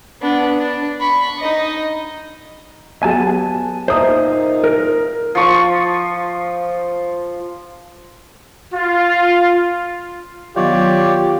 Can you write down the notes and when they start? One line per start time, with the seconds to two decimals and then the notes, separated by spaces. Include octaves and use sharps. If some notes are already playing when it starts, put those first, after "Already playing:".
0.21 B3 D4
0.58 D4
1.00 B5 C#6
1.39 D#4 D#5
3.03 F#3 B3 G4 G#5 A5
3.88 A#2 D#4 C5 E5 A#5 D#6
4.64 A#4
5.35 F3 C#6 D#6
8.74 F4
10.56 D#3 F#3 B3 F4 G4 C#5 D5